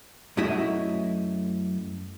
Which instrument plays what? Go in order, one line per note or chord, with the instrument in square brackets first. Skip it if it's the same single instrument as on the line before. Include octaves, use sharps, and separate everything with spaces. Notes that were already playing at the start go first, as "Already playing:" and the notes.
[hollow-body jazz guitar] F#2 F#3 A3 E4 D#5 E5